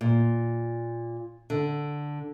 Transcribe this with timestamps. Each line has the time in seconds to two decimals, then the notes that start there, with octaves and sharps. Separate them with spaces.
0.01 A#2
1.50 D3